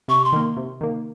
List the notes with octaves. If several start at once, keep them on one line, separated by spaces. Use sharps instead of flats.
C3 C#6
C6
D#3 A#3
C3
D#3 A#3